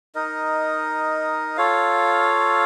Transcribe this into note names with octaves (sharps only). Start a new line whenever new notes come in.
D#4 A#4 D#5
F4 A4 C#5 F5